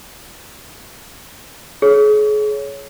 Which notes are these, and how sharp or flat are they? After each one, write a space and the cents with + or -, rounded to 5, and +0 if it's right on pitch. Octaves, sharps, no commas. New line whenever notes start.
G#4 +35 C#5 +5